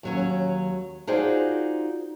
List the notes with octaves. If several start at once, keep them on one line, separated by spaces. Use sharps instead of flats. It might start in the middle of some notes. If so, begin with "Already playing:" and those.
D#2 F#3 C#4
D#4 F4 F#4 G#4 C5 D5